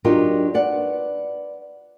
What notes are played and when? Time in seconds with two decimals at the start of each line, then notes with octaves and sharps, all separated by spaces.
0.04 F#3 D4 D#4 F4 G4 A#4
0.54 B4 D5 F#5